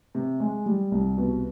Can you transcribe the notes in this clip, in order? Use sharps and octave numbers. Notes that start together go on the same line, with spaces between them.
C3
G#3
G3
C2
B2